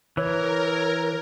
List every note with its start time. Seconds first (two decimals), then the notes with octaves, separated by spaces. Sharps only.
0.17 E3 A#4 C#5